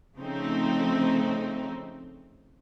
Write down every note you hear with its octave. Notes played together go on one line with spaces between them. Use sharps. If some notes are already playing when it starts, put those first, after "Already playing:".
C#3 F3 A3 C4 D#4